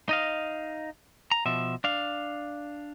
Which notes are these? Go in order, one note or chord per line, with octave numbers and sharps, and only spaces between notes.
D#4 D#5 F5
A#5
B2 F3 E5
D4 F5